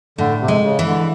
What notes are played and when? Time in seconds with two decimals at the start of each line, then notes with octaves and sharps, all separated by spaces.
0.18 A2 D3
0.41 C3
0.48 G#3
0.63 C#3
0.79 E3
0.86 D3